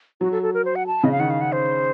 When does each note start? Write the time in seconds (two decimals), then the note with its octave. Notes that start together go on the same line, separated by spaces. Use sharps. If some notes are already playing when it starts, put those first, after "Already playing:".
0.21 F#3 F#4
0.32 A4
0.43 A4
0.54 A#4
0.65 C5
0.76 F#5
0.87 A5
1.03 C#3 D#5
1.12 F5
1.19 D#3 F#5
1.30 F5
1.41 F#5
1.52 C5